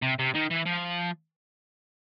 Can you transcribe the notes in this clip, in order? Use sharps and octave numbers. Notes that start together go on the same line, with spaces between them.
C3
C3
D#3
E3
F3